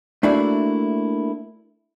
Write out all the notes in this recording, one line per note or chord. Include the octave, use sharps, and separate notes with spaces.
A3 A#3 D4 E4 F#4